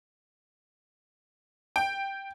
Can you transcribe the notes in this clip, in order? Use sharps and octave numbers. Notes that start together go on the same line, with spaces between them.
G5